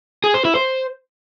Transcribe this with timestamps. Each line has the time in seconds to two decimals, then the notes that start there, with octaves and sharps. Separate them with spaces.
0.24 G#4
0.34 C5
0.45 E4
0.55 C5